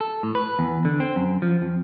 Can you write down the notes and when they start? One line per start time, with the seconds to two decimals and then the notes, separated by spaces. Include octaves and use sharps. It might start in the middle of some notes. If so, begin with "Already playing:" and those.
0.01 A4
0.23 A2
0.35 B4
0.59 E2
0.85 D3
1.00 C4
1.16 F#2
1.42 F3
1.62 F2